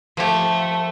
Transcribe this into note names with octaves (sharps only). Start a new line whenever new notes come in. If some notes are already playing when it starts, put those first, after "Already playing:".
F3 A3 G4